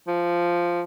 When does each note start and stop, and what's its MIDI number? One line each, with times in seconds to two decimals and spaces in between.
0.07 0.83 53